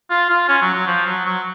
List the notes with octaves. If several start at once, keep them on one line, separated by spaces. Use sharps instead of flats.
F4
F4
C#4
F#3
F#3
F3
F#3
F#3